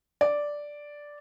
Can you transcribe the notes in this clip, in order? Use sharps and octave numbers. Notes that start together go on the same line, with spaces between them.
D5